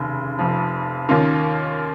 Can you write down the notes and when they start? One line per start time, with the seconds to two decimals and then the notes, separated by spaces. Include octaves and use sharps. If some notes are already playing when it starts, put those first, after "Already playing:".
Already playing: F1 D#2 C#3
0.39 F1 F2 F3
1.09 D#2 D#3 A#3 C#4 F4